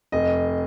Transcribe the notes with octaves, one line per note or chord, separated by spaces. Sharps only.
F1 D#5